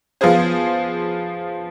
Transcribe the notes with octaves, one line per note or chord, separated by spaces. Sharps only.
F3 B3 F4 G#4 C5